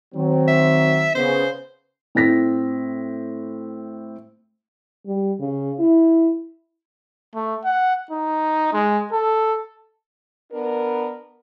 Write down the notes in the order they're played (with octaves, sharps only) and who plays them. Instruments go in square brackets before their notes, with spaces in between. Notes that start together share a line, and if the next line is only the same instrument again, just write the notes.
[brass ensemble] D#3 F#3 C4
[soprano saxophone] E5
[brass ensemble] C#3 B3 [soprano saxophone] C5
[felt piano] A2 C4 A#6 B6
[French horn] G3
C#3
E4
[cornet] A3
F#5
D#4
G#3
A4
[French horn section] B3 D4 A#4